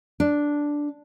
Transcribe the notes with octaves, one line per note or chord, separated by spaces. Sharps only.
D4